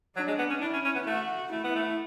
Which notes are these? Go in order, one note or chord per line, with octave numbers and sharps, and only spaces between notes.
F#3 D4
G#3
B3
C#4
D4 E4
C#4
C#4
B3
A3 F#4
A3 E4
B3
A3